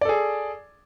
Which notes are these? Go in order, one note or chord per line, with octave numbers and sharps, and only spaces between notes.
G#4 A4 D5